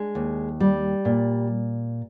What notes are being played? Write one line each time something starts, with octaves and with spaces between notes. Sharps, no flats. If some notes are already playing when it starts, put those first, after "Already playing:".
Already playing: G#3 D4
D#2
G3
A#2